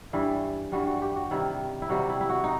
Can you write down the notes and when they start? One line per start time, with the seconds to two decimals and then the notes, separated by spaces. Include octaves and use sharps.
0.13 G2 E3 G3 E4
0.72 G2 E3 G3 F#4
0.87 F#4
1.02 G4
1.16 F#4
1.31 C3 D#3 G3 E4
1.82 E4
1.89 C3 D#3 G3 F#4
2.10 E4
2.21 E4
2.29 F#4
2.44 D#4